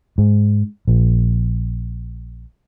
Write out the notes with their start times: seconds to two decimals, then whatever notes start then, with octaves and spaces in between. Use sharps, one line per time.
0.18 G#2
0.88 A#1